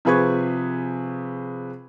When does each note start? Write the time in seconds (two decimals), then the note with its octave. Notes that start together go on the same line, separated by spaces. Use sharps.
0.05 C3 F3 G#4 B4 C#6 G#6